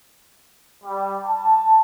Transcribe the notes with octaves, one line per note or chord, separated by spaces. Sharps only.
G3
A5